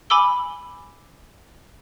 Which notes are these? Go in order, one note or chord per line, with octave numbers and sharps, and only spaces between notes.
G#5 B5 D6 E6 G7